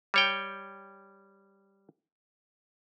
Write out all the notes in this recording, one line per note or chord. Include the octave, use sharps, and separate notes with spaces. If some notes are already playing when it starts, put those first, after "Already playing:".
G3 C#5 G5